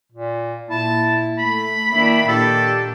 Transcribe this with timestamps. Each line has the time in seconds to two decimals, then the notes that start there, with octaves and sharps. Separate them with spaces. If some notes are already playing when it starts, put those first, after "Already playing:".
0.12 A#2
0.70 A#2 E4 A5
1.38 A3 B5
1.92 D#3 A#3 D4 E4
2.28 A#2 D4 G4 A4